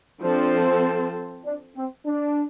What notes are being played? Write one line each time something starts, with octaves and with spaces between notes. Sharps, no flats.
F3 C4 D4 A4 C5
D4
C4
D4